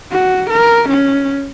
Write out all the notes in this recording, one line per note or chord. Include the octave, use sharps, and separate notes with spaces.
F#4
A#4
C#4